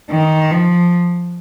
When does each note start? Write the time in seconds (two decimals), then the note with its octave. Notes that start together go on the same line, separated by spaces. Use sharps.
0.11 D#3
0.51 F3